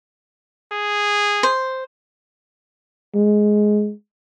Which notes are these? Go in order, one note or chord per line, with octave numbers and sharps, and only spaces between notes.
G#4
C5
G#3